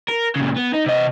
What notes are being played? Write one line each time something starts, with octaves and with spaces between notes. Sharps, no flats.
A#4
A#2 C#3
B3
D#4
C3 D#5